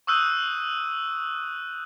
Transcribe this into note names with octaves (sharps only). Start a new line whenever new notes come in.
C#6 D#6 E6 F#6 G6 D#7